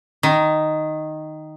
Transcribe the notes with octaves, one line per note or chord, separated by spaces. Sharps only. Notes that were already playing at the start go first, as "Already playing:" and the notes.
D#3